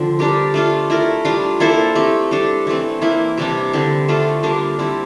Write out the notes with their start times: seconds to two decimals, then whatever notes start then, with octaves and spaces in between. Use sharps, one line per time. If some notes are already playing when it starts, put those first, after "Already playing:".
Already playing: D3 F3 C4
0.19 G3 D4 G4 A#4
0.54 A3 D4 F4
0.90 A3 E4 A#4
1.25 G3 D4 F4
1.60 A#3 E4 A4 C5
1.95 A3 C4 G4
2.31 G3 D4 A4
2.67 E3 A3 C4
3.01 E3 A#3 E4
3.37 C3 E3 G3 D4
3.73 D3 G3 C4
4.08 A3 D4 F4 A4
4.43 D3 G3 A#3 D4
4.79 G3 C4 E4